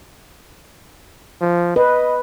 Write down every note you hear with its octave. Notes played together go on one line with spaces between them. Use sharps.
F3
B4 D#5